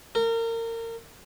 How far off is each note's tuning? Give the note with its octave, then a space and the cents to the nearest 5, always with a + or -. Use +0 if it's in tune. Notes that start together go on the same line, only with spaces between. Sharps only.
A#4 -30